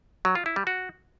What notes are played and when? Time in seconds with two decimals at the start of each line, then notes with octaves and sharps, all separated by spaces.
0.25 F#3
0.35 F4
0.46 E4
0.56 G3
0.67 F#4